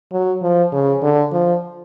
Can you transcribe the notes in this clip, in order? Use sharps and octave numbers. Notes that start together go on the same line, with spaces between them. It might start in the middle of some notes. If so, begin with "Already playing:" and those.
F#3
F3
C#3
D3
F3